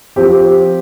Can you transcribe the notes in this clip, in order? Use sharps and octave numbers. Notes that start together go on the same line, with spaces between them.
F3 C4 G4